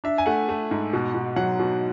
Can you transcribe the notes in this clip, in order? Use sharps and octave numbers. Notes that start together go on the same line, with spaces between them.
D4 E5
G#5
A3 F#5
A3
G#2
B2
B2
F#3 F#5
B2